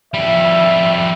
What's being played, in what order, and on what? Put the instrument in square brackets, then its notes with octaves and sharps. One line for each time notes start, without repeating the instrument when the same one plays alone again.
[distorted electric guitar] F2 G3 [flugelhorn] E5